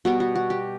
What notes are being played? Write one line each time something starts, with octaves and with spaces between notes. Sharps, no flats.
B2 G3 B3 F#4
F#4
F#4
G4